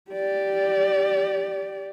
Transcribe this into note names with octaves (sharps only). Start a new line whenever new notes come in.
G4 D5